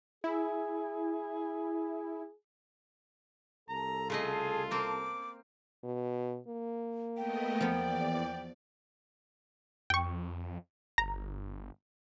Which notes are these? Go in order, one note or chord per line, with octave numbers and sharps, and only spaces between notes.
E4 G#4
C2 A4 A5 A#5
C#3 A3 F4 G#4 D#5
A#3 C4 D6
B2
A#3
A3 B3 D#5 G5
E2 F3 B3 D5
F2 G5 C#6
G1 A#5